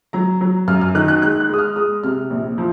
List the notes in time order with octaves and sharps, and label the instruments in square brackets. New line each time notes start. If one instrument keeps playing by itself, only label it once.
[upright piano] F#3 A#5
F#3
F#2 F6
F6
D#3 F#6
F#6
G#3 F#6
F#6
G#3 D#6
F6
G#3 D#6
C3 F6
A#1
F3